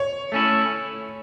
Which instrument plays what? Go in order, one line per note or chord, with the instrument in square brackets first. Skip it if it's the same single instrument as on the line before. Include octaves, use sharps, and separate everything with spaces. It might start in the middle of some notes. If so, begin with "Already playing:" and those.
Already playing: [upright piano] C#5
[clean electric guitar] A3 C#4 E4